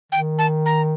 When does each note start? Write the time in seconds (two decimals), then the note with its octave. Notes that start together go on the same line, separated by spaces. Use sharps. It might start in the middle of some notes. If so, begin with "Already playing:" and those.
0.12 D#3 G5
0.39 A5
0.66 A#5